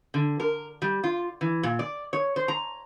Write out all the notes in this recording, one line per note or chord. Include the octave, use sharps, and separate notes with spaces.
D3
A#4
G3
F4
E3
A#2
D5
C#5
C5
A#5